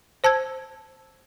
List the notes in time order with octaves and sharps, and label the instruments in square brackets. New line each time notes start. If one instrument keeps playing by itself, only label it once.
[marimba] C5 A5 E6 G#6